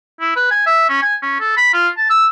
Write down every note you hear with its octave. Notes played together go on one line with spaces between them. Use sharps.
E4
B4
G#5
E5
C#4
G#5
C#4
A4
B5
F4
A5
E6